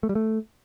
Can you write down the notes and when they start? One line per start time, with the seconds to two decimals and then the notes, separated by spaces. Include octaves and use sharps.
0.03 A3
0.09 G3
0.15 A3